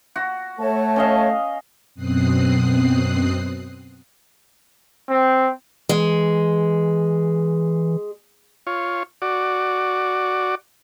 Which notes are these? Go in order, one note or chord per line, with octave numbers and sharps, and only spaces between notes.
F#4
A3 C#5 A5
C#4 D#5 F5
F#2 B2 C4 D#6 F#6 C7
C4
E3 G#3
F4 C#5
F#4 D5